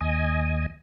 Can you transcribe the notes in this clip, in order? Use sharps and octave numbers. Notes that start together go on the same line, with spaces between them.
D#2 D#5 G#5